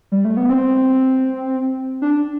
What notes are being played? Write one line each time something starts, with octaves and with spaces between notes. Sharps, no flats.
G3
A3
B3
C4
D4